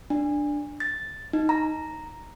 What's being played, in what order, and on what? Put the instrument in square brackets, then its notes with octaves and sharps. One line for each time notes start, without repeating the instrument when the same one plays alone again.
[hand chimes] D4
A6
D#4
A#5